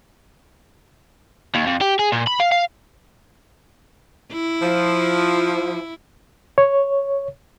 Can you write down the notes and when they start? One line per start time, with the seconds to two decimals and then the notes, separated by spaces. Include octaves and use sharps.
1.55 D#2
1.67 F2
1.81 G4
1.99 G#4
2.12 A#2
2.27 B5
2.40 F5
2.52 F5
4.32 E4
4.62 F3
6.58 C#5